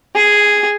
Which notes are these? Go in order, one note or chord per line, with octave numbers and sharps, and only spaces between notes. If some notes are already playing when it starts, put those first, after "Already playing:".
G#4